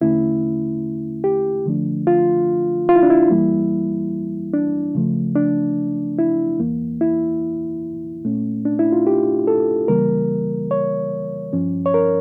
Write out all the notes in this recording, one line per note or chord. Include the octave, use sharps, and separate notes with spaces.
E2 D3 A3 C#4 E4
G4
D3 F3 A3 D4
F4
F4
E4
D4
E4
E2 E3 G3 A#3
D4
C#3 F3 A3
D4
E4
E2 E3 A#3
E4
A#2 A3 C#4
D4
E4
F4
G4
A4
C#3 E3 G3 A#3 A#4
C#5
G2 F3 C#4
C#5
A#4